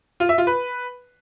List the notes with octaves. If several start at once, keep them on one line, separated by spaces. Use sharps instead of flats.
F4
E5
F4
B4